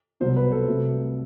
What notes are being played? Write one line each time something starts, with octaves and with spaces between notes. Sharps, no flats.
C2 B2 F#3 C5
B4
A4
C2 C3 F#3 A3